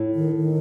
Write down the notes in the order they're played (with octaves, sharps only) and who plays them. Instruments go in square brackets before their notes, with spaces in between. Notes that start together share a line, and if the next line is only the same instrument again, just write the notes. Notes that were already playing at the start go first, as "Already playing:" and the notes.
Already playing: [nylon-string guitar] A2
[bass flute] D#3
D#3